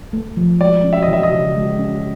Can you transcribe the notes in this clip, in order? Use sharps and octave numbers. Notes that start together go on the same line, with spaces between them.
A3
F3
G#3 D5
C#4
E5
D#5
E3 E5
D#5
C#3
G#3
C#4